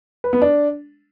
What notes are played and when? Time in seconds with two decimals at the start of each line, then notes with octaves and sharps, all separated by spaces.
0.24 B4
0.33 B3
0.42 D4